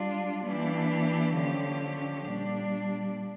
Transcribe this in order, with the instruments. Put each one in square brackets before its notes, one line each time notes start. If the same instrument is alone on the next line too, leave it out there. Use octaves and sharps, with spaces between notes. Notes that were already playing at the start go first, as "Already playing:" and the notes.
Already playing: [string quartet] G3 D4 F4
E3 A#3 D4 G4
D3 F3 C#4 G4
A#2 G3 D4